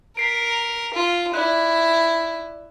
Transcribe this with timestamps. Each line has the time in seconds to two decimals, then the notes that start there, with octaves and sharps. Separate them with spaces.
0.17 A#4 B6 C7 D7
0.94 F4
1.34 E4 D5 F#6